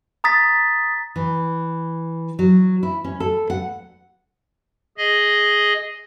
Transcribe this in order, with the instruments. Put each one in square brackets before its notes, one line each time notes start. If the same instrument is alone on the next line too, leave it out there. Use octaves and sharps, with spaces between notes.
[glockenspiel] A#5 D#6 A6 B6
[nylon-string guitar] E3
F#3
E4
C#4
A4
F#5
[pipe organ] G#4 D#5